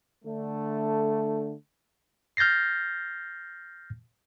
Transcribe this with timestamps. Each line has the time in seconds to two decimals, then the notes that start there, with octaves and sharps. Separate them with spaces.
0.25 D3 A3
2.37 F6 G6 A6 A#6 C7